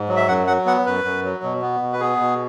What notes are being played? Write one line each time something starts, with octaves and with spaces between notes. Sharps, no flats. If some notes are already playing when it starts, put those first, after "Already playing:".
Already playing: G#2
F#3
E5
F#2 F#5
F#3 F#5
B3 F#5
F#2 B4
F#2
F#3
B2
B3
B2
B4
B3 G#4
B2